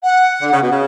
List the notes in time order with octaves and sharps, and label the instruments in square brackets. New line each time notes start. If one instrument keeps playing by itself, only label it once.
[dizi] F#5
[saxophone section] D3
C#3
B2
C#3